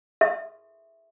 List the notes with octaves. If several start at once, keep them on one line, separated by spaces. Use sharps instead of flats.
E5